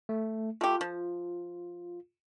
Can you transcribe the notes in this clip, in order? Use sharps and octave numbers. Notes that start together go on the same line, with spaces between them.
A3
A3 F4 G4
F3